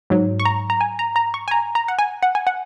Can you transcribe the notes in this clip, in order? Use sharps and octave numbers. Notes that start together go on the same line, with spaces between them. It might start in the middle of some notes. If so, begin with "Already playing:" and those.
G#2 F#3
C#6
A#5
A#5
G#5
A#5
A#5
C#6
G#5
A#5
A#5
F#5
G#5
F#5
G#5
F#5